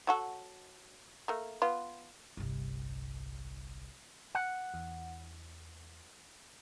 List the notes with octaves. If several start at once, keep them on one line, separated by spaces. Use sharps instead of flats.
F#3 F#4 A4
A3 A#3
B3 F4
G1 C2
F#5
E2